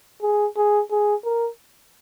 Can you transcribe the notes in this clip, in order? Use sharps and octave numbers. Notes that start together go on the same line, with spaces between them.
G#4
G#4
G#4
A#4